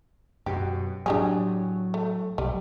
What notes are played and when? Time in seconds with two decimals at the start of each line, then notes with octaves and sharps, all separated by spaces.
0.46 F#2 B2 G4
1.06 A2 F#3 D4 G4 G#4
1.94 A3
2.38 B1 G3